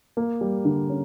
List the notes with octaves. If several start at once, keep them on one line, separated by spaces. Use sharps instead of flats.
A#3
G3
D3
C#4